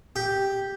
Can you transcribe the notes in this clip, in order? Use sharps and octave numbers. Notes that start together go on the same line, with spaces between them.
G4